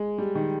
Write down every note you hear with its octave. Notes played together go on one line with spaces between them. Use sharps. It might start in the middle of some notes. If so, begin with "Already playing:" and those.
Already playing: G#3
G3
D#3